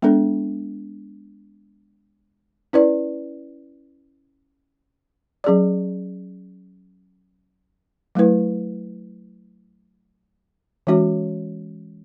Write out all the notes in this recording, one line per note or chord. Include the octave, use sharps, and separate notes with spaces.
G#3 B3 D4 A4
C#4 E4 B4 D5
F#3 C#4 G#4 D5
F#3 A3 E4 B4
E3 G#3 C#4 F#4 C#5